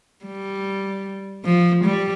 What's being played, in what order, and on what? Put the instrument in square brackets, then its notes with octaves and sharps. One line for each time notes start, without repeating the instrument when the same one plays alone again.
[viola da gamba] G3
F3
G3